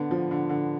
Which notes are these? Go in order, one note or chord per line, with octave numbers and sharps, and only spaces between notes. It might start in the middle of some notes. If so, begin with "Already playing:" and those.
Already playing: D3 B3
F3
D3
D3